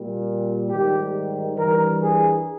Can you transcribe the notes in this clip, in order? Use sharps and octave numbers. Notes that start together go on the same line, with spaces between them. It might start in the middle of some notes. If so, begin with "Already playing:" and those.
Already playing: A#2 G3
G#2 D#3 G3 G4
G2 E3 G3 A#4
G#4